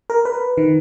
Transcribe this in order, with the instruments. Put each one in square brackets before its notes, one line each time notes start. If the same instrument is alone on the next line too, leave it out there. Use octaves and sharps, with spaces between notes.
[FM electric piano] A#4
B4
D#3